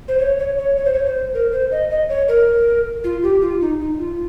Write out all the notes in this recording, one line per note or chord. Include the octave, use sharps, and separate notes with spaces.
C5
C#5
C#5
C#5
C#5
C5
C#5
C5
A#4
C5
D#5
D#5
C#5
A#4
F4
G4
F4
D#4
D#4
F4